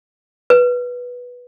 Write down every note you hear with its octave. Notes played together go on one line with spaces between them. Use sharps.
B4